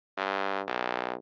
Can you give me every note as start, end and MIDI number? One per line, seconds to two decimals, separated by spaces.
0.17 0.62 43
0.67 1.14 35